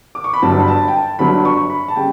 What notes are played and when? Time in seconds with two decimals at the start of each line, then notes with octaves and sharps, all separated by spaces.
0.15 D6
0.24 C#6
0.33 B5
0.42 G1 G2 F#3 A5
0.60 B5
0.68 A5
0.88 G5
0.94 A5
1.19 G1 G2 F#3 B5
1.45 C#6
1.70 B5
1.88 A5
1.96 C#3 G3 G5